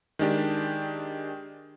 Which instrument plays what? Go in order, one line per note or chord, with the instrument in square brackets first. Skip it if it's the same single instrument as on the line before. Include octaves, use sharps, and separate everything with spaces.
[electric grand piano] D#3 G#3 D4 G4